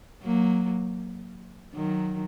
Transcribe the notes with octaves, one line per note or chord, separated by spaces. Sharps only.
F#3 A#3
D#3 F#3